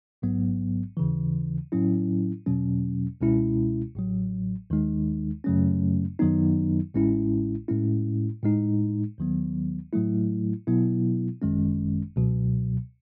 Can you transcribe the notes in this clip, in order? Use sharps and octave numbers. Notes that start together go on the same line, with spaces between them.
A1 G#2 F#3 B3
D#2 C#3 E3
A2 F#3 C#4 E4
E2 B2 F#3 C#4
C#2 B2 G#3 C#4 E4
A1 A2 F#3
D#2 D#3 G#3 D#4
F#2 C#3 F#3 A3 C#4
F#2 D#3 F#3 B3 D#4
A1 A2 G#3 C#4 E4
A2 G#3 C#4 E4
A2 G#3 D#4
D#2 D#3 F#3 B3
A2 F#3 A3 E4
B2 F#3 B3 E4
G#1 F#2 D#3 G#3 C#4
C#2 B2 F#3